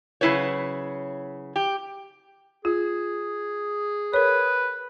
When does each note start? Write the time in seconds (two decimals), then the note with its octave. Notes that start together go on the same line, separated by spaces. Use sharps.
0.21 C#3 F#3 E4 B4 C#5
1.56 G4
2.65 F4 G#4
4.14 A#4 B4 C#5